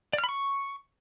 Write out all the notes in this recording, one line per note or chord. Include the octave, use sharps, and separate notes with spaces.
D5
F6
B5
C#6